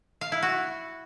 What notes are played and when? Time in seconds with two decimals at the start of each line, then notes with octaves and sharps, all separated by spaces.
0.21 F5
0.32 E4
0.43 F#4